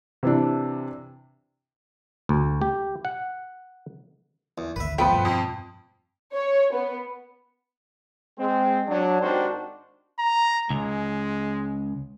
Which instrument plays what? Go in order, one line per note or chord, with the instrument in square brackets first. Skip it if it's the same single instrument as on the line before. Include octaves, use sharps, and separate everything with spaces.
[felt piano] C3 E3 D4
[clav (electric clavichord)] D2
G4
F#5
[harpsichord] E2
[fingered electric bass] G#1 D2 [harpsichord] B4 E5
[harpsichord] F3 [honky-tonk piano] A3 B3 B4 [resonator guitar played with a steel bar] G5
[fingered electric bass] G2 B2
[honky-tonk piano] F2
[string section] C#5
B3
[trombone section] G#3 C4
F#3 D4
G#1 D#3 D4 F#4 G4 C5
[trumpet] A#5
[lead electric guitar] C#2 [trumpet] G#3